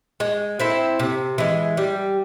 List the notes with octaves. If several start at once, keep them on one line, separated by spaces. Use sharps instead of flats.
G#3
C4 E4 A4
C3
E3 G#3
G3